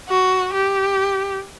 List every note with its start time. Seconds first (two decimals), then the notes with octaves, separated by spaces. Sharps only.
0.09 F#4
0.54 G4